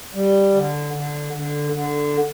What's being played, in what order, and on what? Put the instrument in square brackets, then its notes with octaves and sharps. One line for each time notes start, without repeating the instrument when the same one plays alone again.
[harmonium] G3
D3
D3
D3
D3